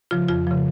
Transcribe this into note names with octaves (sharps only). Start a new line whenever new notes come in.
C#3 F3 F4
F2 F4
C#3 F3